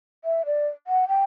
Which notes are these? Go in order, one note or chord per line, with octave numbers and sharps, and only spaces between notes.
E5
D5
F#5
G5